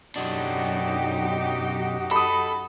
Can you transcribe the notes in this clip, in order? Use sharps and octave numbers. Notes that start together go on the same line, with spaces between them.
B1 F#2 D4 D#4 F#4 G4 D#5
A4 B5 D#6